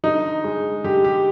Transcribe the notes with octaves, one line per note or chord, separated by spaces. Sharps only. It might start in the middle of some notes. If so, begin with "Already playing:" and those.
D3 D#4
G#3
D3 G4
G4